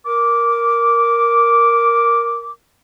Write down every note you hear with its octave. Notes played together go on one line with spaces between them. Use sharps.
A#4 D6